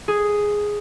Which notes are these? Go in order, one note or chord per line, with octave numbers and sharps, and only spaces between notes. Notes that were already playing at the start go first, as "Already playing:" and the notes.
G#4